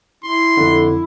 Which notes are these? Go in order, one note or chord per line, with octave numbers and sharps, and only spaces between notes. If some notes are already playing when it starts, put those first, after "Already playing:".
E4 C6
F2 D3